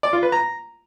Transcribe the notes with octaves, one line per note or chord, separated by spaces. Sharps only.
D5
F4
B4
A#5